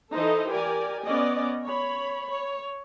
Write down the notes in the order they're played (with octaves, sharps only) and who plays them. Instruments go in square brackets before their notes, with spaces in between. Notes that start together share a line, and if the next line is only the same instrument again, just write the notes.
[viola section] E3 D#4 A4 C5 D#5
G4 A#4 D5 G#5
B3 C#4 D5 D#5
C#5 B5
C#5